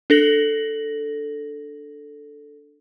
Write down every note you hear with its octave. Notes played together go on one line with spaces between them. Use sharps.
D4 A4 A#6 F#7